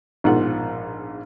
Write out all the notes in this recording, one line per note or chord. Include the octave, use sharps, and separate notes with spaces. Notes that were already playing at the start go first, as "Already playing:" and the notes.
A#1 G#2 B2 G#3 F4 F#5